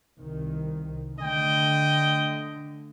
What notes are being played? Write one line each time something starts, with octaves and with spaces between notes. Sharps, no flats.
C2 D#3
D3 A3 D#5 G5